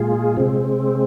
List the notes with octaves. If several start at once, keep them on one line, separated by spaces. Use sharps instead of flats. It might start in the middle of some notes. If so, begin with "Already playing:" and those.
Already playing: A#2 G#3 F4 G#4
C3 G#3 C4